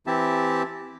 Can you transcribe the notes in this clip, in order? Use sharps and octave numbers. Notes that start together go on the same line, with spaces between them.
E3 C4 E4 G4 E5 A5